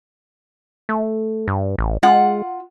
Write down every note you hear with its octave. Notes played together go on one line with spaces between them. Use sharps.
A3
G2
A1
G#3 F4 F#5